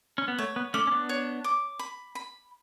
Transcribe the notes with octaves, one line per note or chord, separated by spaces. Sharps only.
C#4
B3
A3 C#5
B3
A3 C#4 D6
C#4
B3 D4
C#5
D6
B5
B5